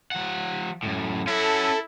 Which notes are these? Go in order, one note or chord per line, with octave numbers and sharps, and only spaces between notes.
F3 F#5
F#2 A2
C#4 E4 F#4 A4